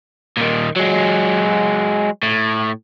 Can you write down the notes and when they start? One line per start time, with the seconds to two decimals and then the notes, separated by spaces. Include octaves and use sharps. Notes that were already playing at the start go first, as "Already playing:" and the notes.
0.37 A#2 D#3
0.76 F#3 G#3
2.23 A2